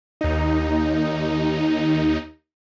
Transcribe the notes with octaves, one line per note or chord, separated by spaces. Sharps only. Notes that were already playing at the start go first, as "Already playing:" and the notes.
D#2 D#4